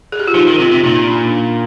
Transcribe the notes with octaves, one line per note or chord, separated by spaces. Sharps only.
G#4
G4
F4
F3 D#4
D#3
C3 F4
C3
A#2 D#4
D4